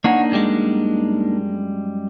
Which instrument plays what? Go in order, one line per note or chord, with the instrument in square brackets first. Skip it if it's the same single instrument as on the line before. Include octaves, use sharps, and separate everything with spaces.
[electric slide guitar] A#3 D4 D#4 [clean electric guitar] C#5 F#5
[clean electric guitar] F#2 G3 G#3